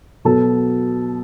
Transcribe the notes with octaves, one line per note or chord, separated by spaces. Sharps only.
B2 F#3 B3 A4